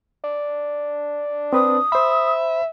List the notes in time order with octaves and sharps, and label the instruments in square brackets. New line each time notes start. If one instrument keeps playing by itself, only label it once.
[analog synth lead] D4
[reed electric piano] C4 B4 [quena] D#6
[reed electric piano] C5 B5 [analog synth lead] E5